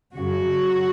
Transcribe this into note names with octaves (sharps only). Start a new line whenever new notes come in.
F#2 C#3 F#3 F#4